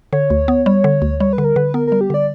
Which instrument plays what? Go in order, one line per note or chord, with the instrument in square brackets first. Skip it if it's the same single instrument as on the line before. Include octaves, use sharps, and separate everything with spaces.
[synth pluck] D3 [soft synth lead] C#5
[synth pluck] D2
B3
[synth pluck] G3 [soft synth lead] C#5
[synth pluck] D3
D2
[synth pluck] G3 [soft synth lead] C#5
[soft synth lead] B4
[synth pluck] D3
[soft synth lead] A#4
[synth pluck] D3 [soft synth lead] B4
[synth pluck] B3 [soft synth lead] A#4
[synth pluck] G3 [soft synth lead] A#4
[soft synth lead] G4
[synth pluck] D3 [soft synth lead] D5